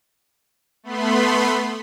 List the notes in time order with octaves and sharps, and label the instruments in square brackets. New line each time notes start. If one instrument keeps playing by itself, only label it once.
[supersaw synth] A3 B3 B5 C6